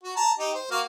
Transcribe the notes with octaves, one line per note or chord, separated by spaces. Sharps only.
F#4
A5 A#5
D#4 G4
C5
A#3 F#4 F5